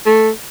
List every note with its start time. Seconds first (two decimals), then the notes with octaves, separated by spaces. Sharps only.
0.06 A3